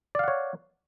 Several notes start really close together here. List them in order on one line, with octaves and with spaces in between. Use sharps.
D5 F5 F#5 C#5